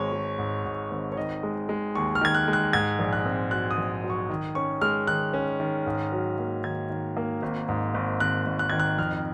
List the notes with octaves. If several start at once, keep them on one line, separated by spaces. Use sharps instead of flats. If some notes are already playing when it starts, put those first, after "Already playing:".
Already playing: G#1 G#3 C#5
G#3
G#2
G#2
G#1
C#5
D#3 D#5
G#3
G#3
D#2 C#6
F6
D#3 G#6
F#6
G#3
F#6
G#2 G#6
A#1
F#6
C4
F#3 F#6
D#6
A#1
F#3
C#6
D#3
C#4 C#6
G#3 F6
D#3 F#6
C#4
D#3
G#2
F#3
A#3
D#3 G#6
D#3
A#3
G#1
G#2
G#1
G#1 F#6
G#1
F#6
D#3 G#6
F#6
F2 F6